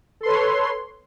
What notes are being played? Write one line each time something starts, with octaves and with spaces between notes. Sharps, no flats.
A4 B4 C#5 C6